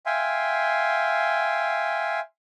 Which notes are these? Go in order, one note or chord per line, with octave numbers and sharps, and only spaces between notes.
E5 F5 G5 G#5 C6